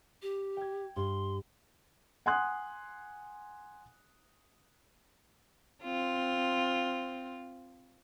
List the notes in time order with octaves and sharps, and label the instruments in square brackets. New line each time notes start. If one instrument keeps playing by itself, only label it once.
[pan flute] G4
[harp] G5 G#6
[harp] G2 [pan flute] C6
[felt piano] F#5 G#5 C6 D#6 F#6
[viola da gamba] C4 F4